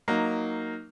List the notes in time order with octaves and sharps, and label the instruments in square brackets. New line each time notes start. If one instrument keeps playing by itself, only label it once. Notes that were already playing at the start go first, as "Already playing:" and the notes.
[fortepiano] F#3 A#3 D#4